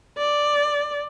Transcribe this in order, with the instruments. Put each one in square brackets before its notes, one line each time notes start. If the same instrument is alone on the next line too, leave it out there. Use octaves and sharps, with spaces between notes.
[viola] D5